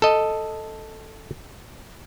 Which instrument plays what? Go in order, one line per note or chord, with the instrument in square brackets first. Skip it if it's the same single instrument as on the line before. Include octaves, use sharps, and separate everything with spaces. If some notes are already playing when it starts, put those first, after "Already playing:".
[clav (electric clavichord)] A4 D#5